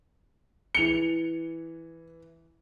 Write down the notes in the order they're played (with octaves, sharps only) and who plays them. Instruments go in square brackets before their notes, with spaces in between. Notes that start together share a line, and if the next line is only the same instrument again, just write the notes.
[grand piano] E3 G7 [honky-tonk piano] C#7 F7